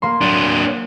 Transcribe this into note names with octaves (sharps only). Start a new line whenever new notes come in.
A#3 C6
F#3 D4